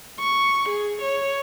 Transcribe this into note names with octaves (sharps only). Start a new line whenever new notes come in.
C#6
G#4
C#5